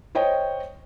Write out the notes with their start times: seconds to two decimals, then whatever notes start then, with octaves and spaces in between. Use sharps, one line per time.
0.15 C5 C#5 D#5 G5